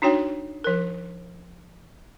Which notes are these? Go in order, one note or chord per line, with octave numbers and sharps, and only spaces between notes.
D4 D#4 F#4 C#5 G5
F3 A#4